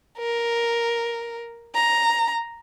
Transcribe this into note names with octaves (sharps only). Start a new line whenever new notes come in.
A#4
A#5